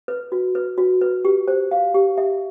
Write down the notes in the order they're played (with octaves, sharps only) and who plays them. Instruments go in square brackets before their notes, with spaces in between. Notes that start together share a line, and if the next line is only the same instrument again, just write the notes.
[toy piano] B4
F#4
B4
F#4
B4
G4
C5
F5
G4
E5